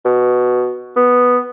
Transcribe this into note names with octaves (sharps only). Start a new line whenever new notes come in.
B2
B3